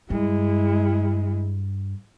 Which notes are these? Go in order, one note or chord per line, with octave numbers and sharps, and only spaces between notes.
G2 G#3 E4